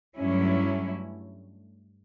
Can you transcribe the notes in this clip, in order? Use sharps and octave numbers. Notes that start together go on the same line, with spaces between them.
G2 F#3 A3 C#4 E4